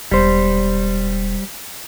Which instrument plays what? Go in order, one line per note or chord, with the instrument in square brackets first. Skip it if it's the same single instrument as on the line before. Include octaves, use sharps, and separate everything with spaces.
[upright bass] E1 [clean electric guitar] G3 C5